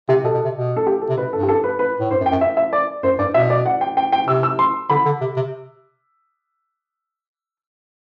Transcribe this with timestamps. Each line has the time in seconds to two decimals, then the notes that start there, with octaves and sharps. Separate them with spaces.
0.09 C3 G4
0.24 B2 A4
0.34 B2
0.45 C3
0.55 B2
0.77 A4
0.87 G4
1.02 A4
1.09 C3
1.17 B2 B4
1.33 G2 A4
1.43 G4
1.49 A4
1.64 B4
1.79 B4
2.00 A2
2.10 G2 C5
2.21 F#2
2.26 G5
2.31 F#2
2.41 E5
2.57 E5
2.73 D5
3.03 F#2 C5
3.19 G2 D5
3.34 B2 E5
3.50 D5
3.66 F#5
3.81 G5
3.97 G5
4.12 G5
4.27 C3 E6
4.43 E6
4.59 C6
4.90 D3 B5
5.05 D3
5.21 C3
5.36 C3